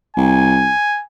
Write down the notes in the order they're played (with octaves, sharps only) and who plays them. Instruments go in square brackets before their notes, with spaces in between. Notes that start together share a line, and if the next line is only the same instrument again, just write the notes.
[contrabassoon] C2 [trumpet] G#5